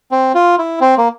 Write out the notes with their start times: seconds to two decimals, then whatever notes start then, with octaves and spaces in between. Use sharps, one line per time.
0.11 C4
0.35 F4
0.58 E4
0.81 C4
0.98 A#3